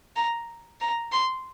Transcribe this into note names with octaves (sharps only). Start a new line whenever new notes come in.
A#5
A#5
C6